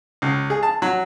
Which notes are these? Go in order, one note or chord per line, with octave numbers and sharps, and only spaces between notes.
C#2
G#4
A5
F#3